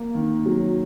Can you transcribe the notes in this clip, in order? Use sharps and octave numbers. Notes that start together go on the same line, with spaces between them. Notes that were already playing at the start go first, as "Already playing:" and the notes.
Already playing: A#3
D#3
F#3